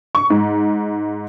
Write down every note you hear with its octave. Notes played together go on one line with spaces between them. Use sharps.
C#6
G#2